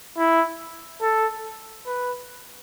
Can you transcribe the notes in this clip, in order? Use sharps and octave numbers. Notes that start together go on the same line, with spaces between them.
E4
A4
B4